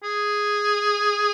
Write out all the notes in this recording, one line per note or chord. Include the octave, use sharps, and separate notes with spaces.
G#4